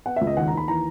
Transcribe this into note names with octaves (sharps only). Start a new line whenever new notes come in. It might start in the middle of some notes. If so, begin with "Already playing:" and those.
B3 F#5
C#2 E5
D#5
D#2 F#5
A#5
D#2 B5
E3 A#5